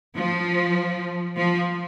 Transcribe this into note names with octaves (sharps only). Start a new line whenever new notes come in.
F3
F3